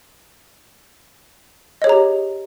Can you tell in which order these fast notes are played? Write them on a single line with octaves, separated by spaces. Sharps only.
D#5 C#5 G#4 A#5 G4